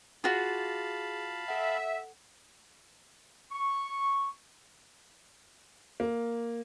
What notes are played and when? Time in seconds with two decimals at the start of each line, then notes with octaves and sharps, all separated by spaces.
0.24 F4 F#4 G#4 F5 A5 B5
1.48 A4 E5 F#5
3.51 C#6
6.00 A#3